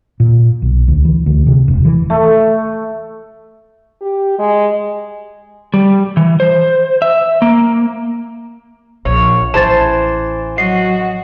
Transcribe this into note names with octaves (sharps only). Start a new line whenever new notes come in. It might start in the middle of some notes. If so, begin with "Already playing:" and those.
A#2
B1
D2
E3
D2
C3
E1
E3
A3
G4
G#3
G3
E3
C5
E5
A#3
A#1 C#5
A1 E3 C5 A5 A6
F#3 F#4 D#5 C7